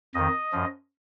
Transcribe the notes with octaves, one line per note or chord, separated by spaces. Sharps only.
F2 D#3 D#5
F#2 F3